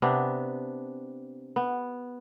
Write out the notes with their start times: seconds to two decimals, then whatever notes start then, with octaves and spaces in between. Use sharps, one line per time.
0.02 C3 B3 D4
1.56 B3